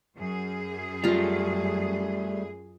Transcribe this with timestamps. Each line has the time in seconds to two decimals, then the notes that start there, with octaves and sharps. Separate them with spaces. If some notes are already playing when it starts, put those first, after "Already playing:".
0.16 F#2 G#4
1.04 G3 A3 F4 A#5